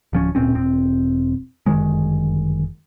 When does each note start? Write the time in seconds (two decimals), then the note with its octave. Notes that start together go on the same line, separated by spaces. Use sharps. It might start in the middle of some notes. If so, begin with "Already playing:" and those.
0.13 D1 F3 C#4
0.35 D1 A#2 C4 C#4
0.54 E1 C4
1.66 G1 F#2 D#3 G#3